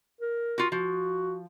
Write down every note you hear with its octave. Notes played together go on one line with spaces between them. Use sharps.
A#4
F4 F#4
F3 F#4